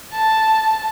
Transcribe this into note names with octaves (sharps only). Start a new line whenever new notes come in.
A5